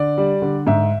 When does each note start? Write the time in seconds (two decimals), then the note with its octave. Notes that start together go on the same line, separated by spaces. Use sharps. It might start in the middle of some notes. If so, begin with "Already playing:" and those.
Already playing: D3 D5
0.18 G3
0.42 D3
0.67 G#2 E5